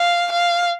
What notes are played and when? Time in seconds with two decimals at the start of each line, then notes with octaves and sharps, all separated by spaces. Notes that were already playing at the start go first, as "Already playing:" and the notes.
Already playing: F5
0.31 F5